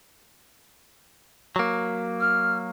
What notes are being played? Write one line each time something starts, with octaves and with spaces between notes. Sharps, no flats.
F#3 A#3
F6